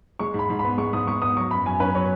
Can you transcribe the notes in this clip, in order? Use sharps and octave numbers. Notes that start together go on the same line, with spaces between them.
G#3 C#6
G#2 B5
G#2
B5
B3
G#3 C#6
G#2 D#6
G#2 C#6
B3 D#6
F#3 C#6
F#2 B5
F#2 G#5
C#4 B4
F#3 C#5